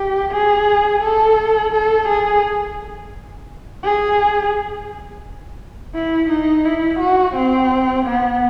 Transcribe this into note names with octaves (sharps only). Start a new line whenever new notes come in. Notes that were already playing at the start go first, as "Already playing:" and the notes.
Already playing: G4
G#4
A4
A4
G#4
G#4
E4
D#4
E4
F#4
C4
B3